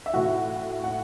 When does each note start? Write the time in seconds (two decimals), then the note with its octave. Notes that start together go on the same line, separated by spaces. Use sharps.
0.06 E5
0.13 A2 E3 F#4 F#5
0.84 F#5